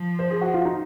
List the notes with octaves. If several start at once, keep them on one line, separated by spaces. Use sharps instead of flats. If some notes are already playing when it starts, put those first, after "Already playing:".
Already playing: F3
C5
G#4
F#4
F4
D#4